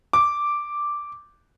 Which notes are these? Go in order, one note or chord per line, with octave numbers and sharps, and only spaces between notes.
D6